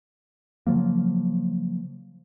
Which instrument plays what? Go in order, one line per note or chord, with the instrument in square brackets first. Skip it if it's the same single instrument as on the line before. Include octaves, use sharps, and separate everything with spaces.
[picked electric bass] C#3 F3 F#3 A#3